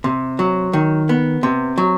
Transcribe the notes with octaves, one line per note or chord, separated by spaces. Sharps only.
C3
F#3
D#3
B3
C3
F#3